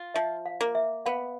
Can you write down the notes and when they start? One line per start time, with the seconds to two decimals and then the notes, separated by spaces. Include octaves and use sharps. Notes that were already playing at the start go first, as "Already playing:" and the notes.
Already playing: F4
0.14 F3 E5
0.46 F5
0.61 A#3
0.75 E5
1.06 B3 F5